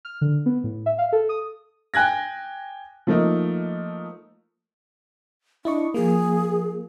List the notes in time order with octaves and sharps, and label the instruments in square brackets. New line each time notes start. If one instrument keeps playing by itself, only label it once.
[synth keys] F6
D3
B3
A2
E5
F5
A4
D#6
[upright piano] G5 G#5 F#6 G#6 A#6
F3 A3 A#3 D#4
[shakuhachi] D4 [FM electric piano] E4 D#5 C#6
[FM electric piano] F3 A#3 [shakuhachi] G#4